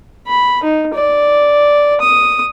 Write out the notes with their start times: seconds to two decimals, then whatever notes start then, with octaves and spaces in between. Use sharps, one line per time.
0.27 B5
0.64 D#4
0.94 D5
2.01 D#6